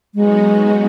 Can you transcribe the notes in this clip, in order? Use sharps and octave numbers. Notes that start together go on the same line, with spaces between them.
F#3 G#3 B3 D#4 F#4